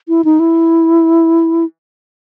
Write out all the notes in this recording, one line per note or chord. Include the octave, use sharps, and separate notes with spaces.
E4
D#4
E4